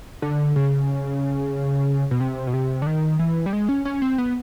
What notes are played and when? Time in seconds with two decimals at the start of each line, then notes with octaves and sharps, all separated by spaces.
0.22 D3
0.56 C#3
2.11 B2
2.20 C3
2.47 B2
2.54 C3
2.82 D3
2.87 D#3
3.19 E3
3.46 G3
3.53 G#3
3.69 C#4
3.85 C#4
4.02 C4
4.18 B3